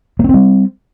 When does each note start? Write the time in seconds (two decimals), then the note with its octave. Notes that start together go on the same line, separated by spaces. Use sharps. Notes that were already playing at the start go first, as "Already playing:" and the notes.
0.19 A#3
0.24 C#4
0.29 C4
0.34 G3